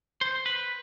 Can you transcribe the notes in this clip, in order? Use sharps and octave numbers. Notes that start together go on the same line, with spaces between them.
C5
B4